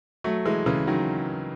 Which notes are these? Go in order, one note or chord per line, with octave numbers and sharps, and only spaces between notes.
F#3 A3
E3 G#3
C#3 E3
D#3 F#3